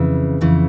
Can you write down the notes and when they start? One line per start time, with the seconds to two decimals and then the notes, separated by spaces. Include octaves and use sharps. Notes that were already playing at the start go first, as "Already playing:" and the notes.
Already playing: F2 C#3 E3
0.41 F2 C#3 E3